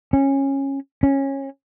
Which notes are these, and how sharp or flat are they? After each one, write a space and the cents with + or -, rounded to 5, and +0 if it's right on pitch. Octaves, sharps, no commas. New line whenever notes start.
C#4 -15
C#4 -20